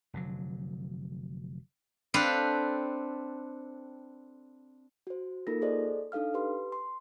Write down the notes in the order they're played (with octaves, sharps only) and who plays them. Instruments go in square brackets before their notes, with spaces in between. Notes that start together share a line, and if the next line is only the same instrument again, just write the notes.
[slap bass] F1 D3 F#3
[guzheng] C4 D4 A4 B4 C5 F5
[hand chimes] F#4 C5
A#3 D#4 F4 A4 A#4 A#6
G#4 A4 C5 D5 D#5
D4 D#4 A4 F5 F6
G4 B4 C6
C6